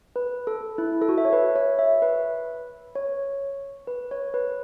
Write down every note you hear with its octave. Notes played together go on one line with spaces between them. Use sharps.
B4
A4
E4
A4
F#4
E5
C#5
B4
C#5
E5
B4
C#5
B4
C#5
B4